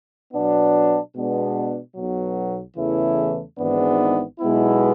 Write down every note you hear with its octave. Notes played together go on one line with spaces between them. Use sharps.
B2 F#3 B3 D4
B2 G#3 B3 D4
B1 B2 F#3
E2 C#3 E3 A3 E4
G#1 G#2 E3 B3 D4
B1 B2 G#3 B3 E4